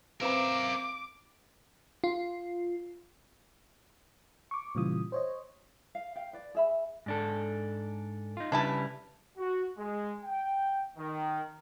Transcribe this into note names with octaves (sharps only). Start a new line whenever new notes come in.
C4 A#4 B4 E5 F5 A#5 D6
F4
C#6 D6
A#2 C#3 E3 G3 F4 D#6
C5 C#5 D#5
F5
F5 G5
B4 D5
G#4 E5 B5
G#2 D4 A4
D#4 F4
C#3 G3 D4 E4 B4 A5
F#4
G#3
G5
D#3